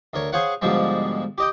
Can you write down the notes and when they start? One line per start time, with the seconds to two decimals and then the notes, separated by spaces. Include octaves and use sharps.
0.14 D2 A#4 C#5
0.32 G#4 C5 C#5 F5 F#5
0.62 G#2 B2 D3 F3 G3 G#3
1.38 G4 D#5 G5